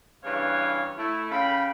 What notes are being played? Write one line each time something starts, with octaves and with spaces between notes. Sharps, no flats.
G2 C#3 E3 B4 C#5 F5
A3 E4
C#3 F5 G5 B5